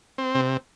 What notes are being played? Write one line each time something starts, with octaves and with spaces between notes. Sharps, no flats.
C4
C3